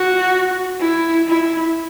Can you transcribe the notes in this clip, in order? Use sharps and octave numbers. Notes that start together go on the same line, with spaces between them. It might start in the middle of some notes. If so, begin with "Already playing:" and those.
Already playing: F#4
E4
E4